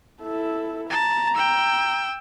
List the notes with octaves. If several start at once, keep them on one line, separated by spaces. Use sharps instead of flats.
E4 A4
A5 A#5
G5 E6